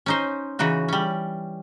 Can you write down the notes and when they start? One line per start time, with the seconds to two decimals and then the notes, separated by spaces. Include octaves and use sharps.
0.06 C#4 D#4 C5
0.59 C#3 E3 D#4 F#4
0.88 G3 C#4